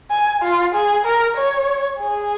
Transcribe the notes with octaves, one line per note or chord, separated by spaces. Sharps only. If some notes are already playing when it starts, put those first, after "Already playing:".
G#5
F4
G#4
A#4
C#5
G#4